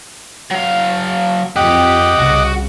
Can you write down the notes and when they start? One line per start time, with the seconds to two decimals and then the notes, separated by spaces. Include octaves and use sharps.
0.50 F#3 F5
1.56 F2 G4 D#5 F#5 D6
2.19 C2 C#3 F#4